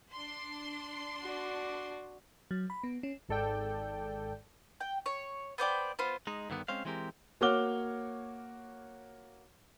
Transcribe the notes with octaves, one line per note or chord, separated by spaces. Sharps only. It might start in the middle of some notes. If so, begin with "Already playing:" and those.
D4 C6
F#4 D5
F#3
B5
B3
C#4
G#1 G#2 A4 D5 G5
G5
C#5
B3 C5 D5 G5
B3 F4 C5
G#3 D#4
G2 D3 D#3 B3
G#3 C4 C#4 C5 F5
E3 G#3 C4 G4 A#4
A#3 F#4 C#5 D6 F6 G7